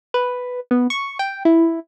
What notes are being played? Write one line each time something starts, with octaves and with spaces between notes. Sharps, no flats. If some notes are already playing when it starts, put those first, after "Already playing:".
B4
B3
C#6
G5
E4